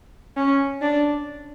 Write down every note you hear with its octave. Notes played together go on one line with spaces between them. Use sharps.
C#4
D4